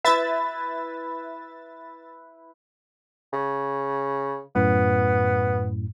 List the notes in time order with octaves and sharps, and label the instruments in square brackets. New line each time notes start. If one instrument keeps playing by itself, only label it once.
[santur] E4 B4 [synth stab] E5 A6
[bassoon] C#3
[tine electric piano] F#2 A2 [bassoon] B3